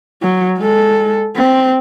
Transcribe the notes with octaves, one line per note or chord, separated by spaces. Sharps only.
F#3
G#3 A4
C4